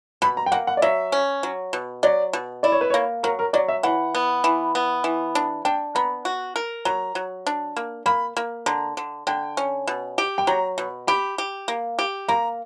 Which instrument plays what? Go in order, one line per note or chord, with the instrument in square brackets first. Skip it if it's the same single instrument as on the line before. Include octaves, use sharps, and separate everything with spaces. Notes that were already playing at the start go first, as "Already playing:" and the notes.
[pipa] B2 [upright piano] B5
[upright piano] A#5
G5
[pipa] A#3 [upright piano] F#5
[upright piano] F#5
D5
[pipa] F#3 [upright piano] E5
[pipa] C#4
F#3
B2
[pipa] F#3 [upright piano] D5
[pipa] B2
[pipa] E4 [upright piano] D5
[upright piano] C#5
B4
[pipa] A#3 [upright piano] C#5
[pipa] F#3 [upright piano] A#4
[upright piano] A#4
[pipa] F#3 [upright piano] D5
[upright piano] E5
[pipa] E3 [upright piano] F#5
[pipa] B3
E3
B3
E3
D4
[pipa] D4 [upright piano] G5
[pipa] B3 [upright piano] A#5
[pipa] F#4
A#4
[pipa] F#3 [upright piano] A#5
[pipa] F#3
D4
A#3
[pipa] A#3 [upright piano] B5
[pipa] A#3
[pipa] D3 [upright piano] A#5
[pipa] D3
[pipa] D3 [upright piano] G5
[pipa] C#4
B2
G4
[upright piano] G5
[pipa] F#3 [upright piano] A#5
[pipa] B2
[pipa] G4 [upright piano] B5
[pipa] G4
A#3
G4
[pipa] A#3 [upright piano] A#5